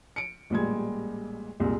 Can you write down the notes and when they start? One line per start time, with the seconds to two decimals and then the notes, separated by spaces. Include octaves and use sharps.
0.16 C#7 D7
0.50 A1 A#2 G3 G#3 G#6
1.60 C2 A#2 G#3